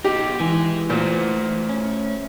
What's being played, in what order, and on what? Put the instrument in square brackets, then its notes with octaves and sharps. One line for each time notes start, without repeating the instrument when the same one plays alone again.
[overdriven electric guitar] B2 D#4 [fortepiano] G4
[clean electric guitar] E3 [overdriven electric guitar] G#3 G#5
[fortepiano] A#2 [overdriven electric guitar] A3 C5
[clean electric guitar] C#4